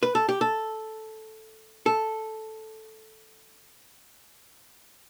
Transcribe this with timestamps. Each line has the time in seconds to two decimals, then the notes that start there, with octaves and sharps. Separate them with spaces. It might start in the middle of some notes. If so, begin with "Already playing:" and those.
0.03 B4
0.15 A4
0.29 G4
0.41 A4
1.86 A4